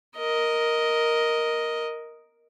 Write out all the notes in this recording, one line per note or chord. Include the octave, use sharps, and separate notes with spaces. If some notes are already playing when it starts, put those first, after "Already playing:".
A#4 D#5